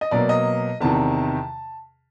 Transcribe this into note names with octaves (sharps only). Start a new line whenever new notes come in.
D#5
B2 F#3 A#3 D5
D#5
E2 C3 D#3 A5